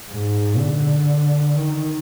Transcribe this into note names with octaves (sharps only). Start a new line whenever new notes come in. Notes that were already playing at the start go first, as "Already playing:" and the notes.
G#2
D3
D#3